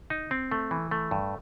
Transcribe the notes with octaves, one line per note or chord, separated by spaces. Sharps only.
D#4
C4
A3
E3
A3
G2